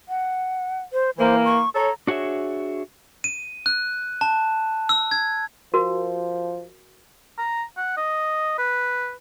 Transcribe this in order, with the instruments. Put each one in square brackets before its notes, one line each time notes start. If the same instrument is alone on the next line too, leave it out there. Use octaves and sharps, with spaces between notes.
[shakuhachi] F#5
C5
[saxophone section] E3 A#3 [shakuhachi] C5
[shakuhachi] C#6
[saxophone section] A4 C#5 [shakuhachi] A#5
[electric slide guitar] D4 F#4 G#4 C#5 E5
[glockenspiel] D#7
F#6
A5
E6
G#6
[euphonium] F3 [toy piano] F#4 A#4
[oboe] A#5
F#5
D#5
B4